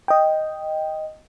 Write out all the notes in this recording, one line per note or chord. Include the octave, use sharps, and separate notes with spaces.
D#5 G5